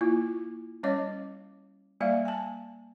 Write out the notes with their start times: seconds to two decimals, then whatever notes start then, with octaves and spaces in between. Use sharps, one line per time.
0.01 A#3 E4 F4
0.83 G3 C#4 C#5 D#5 D6
2.00 G3 A#3 D5 E5 F5
2.25 G#5 A5